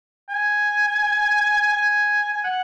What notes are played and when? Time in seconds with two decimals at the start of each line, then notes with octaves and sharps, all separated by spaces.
0.29 G#5
1.73 G#5
2.32 G#5
2.44 F#5